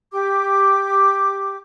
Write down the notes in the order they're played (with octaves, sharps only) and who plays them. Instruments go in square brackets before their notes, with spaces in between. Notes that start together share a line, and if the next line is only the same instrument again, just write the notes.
[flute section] G4 D6